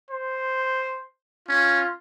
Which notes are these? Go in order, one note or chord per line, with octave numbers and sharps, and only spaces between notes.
C5
C#4 F4